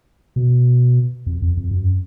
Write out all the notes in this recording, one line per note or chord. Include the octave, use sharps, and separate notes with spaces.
B2
F2
F2
F2
F#2